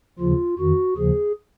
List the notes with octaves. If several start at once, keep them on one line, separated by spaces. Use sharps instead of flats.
D#2 C#3 F3 F4
F2 D#3 F#4
D#2 C#3 F3 G#4